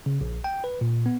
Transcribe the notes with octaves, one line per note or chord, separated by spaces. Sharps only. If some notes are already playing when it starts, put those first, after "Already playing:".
C#3
A#1
G5
B4
A#2
B3